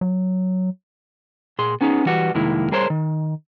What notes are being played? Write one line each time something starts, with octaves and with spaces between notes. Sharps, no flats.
F#3
A#2 G#4 C6
B3 C#4 D#4 G#4
E3 G3 F#4 G4 B4
C2 F2 D#3 G#3 A#3 E4
G3 G#4 A#4 C5 C#5 C6
D#3